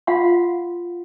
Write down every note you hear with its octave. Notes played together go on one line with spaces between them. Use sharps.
F4 F5 F#5 C6